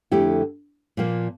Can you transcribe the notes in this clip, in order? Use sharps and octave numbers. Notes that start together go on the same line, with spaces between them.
F2 D3 A3 E4 G4
A#2 F3 A#3